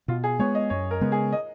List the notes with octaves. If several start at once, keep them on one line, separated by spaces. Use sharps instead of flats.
B2 F4
G#4
G#3 B3 C#5
D#5
F#2 C#5
A#4
C#3 G#3 B3
G#4
D#5